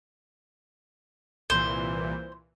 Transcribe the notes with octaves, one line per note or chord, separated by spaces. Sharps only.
C2 A#2 E3 C5